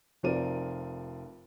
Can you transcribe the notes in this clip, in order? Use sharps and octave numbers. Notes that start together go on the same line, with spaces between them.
F1 F3 C4 A#4 D5 D#7